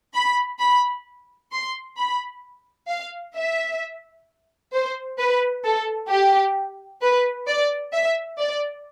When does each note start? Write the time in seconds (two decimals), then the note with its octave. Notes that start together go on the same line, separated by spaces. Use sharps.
0.15 B5
0.60 B5
1.52 C6
1.98 B5
2.89 F5
3.35 E5
4.73 C5
5.18 B4
5.64 A4
6.10 G4
7.01 B4
7.47 D5
7.93 E5
8.39 D5